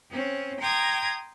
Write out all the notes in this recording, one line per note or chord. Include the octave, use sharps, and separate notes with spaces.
C4 C#4
G5 A#5 C6 D#6 G#6